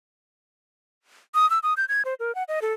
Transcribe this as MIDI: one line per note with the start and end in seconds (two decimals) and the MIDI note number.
1.35 1.49 87
1.50 1.59 88
1.63 1.74 87
1.77 1.85 91
1.89 2.02 92
2.05 2.14 72
2.20 2.34 70
2.35 2.43 78
2.48 2.60 75
2.62 2.73 69